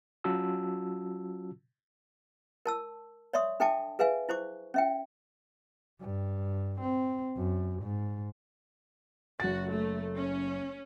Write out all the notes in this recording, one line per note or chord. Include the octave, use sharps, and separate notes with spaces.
F#3 C#4 F4 F#4 A5 E6
A#4 A5 E6
C#5 D5 E5 C6 C#6 D#6
D4 A4 E5 G5 A5 D6
G#4 B4 E5 F5 G#5
E4 C5 C#6 D6
C#4 E5 G5
G2
C4
F#2
G#2
F#1 F#4 A6
A3
C#4